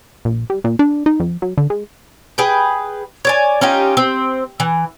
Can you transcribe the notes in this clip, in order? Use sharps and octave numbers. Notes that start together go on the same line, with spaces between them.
A#1
G3
A#2
D4
D#4
F2
F#3
D3
G#3
G#4 B4 G5
C#5 D5 G#5
C#4 D#4 F4 G4
C4
E3